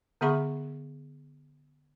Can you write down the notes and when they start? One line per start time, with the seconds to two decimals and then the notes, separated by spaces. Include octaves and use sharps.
0.21 D3 B3 G#4 E5 B5 C#6